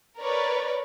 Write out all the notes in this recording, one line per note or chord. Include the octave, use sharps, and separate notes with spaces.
A#4 B4 C#5 D5